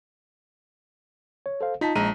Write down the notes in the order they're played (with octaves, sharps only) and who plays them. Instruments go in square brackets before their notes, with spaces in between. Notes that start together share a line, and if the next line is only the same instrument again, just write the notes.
[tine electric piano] C#5
A4 C5 F5
[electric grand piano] D#4 B6 [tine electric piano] F4 A5
[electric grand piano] A#1 A#5 D#7 [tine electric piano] G#3